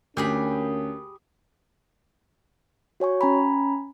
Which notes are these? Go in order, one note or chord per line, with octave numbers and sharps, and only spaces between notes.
D2 A#3 C#4 G4 G#4 B5
F#4 C#5 G#5 C#6
C#4 G#5 A#5 B5